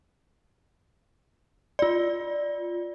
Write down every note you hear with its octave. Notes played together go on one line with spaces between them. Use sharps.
F4 D5